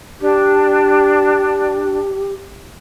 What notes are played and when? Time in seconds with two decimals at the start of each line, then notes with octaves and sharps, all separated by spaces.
0.21 D4 G4